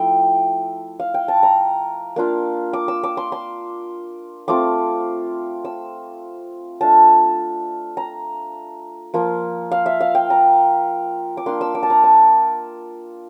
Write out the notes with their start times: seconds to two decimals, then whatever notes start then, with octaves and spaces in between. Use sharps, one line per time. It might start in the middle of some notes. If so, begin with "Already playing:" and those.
Already playing: F3 A3 E4 G5
1.00 F5
1.14 G5
1.28 A5
1.43 A#5
2.16 A#3 D4 F4
2.73 D6
2.88 E6
3.04 D6
3.17 C6
3.32 C6
4.48 A3 C4 F4 D6
5.65 E6
6.81 A3 D4 F4 A5
7.97 A#5
9.14 F3 A#3 F4
9.71 F5
9.86 E5
10.01 F5
10.15 G5
10.30 A#5
11.37 D6
11.46 A#3 D4 F4 C6
11.61 E6
11.75 D6
11.83 A5
11.90 A#5
12.04 A5